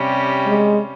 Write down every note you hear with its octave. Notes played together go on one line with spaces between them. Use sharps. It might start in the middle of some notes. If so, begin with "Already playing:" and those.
Already playing: C3 G3 C#4
G#3